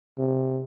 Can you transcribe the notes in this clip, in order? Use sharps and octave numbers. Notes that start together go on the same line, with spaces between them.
C3